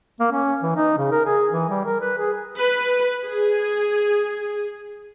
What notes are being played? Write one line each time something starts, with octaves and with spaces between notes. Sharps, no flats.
A#3
C#4
E3
D#4
C#3
A#4
G#4
E3
G3
A#4
B4
G#4
B4
G#4